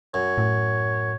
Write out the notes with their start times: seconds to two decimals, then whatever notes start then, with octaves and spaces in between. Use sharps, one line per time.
0.14 F#2 C#5
0.38 A2